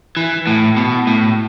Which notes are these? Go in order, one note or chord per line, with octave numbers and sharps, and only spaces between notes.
E3
A2
B2
A2